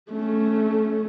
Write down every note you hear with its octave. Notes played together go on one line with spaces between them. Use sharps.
A3 C#4